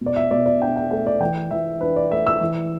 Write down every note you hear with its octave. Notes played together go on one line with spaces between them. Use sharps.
B2
D5
E5
B2 D5
D5
D4 G5
G5
A3 G5
D5
E3 G5
E3 E5
D4 B4
D5
A3 E5
E6
E3